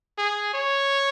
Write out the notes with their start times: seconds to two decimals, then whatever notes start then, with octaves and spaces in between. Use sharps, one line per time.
0.18 G#4
0.54 C#5